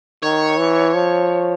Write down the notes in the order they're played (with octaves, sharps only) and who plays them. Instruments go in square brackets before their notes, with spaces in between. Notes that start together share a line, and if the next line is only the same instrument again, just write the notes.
[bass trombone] D#3 [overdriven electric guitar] C#5
[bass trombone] E3
F3